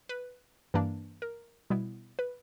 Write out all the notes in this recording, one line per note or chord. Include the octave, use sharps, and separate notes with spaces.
B4
G2 E3 A#3 D4
A#4
B2 G3 B3 E4
B4